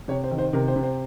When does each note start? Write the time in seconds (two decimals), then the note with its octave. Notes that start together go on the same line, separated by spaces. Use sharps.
0.08 C3 C#5
0.24 C5
0.31 D#3
0.38 C5
0.53 C3 A#4
0.68 C5
0.76 C3
0.83 C5